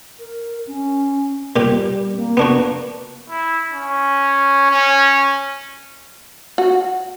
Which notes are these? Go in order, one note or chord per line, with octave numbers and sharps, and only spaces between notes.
A#4
C#4
A#2 G3 G4
A#3
B3 D4 F#4
E4
C#4
C#4
F#4